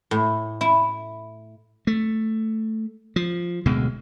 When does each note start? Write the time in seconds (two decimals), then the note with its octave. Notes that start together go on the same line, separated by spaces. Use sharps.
0.11 A2
0.61 E4
1.87 A3
3.16 F3
3.66 D1 D2 B2 G#3